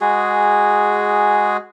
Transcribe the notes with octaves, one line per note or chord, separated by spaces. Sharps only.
G#3 F#4 G#4